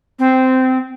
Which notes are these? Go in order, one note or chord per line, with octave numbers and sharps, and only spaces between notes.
C4